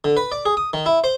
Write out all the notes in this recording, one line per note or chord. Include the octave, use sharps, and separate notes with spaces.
D3
B4
D5
G#4
D#6
D#3
E4
C5